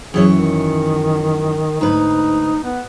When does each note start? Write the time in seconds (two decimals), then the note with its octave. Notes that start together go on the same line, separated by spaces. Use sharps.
0.14 F#2 E3 G#4 C#5
0.31 D#3
1.81 D2 G#2 D#4 B4
2.64 B3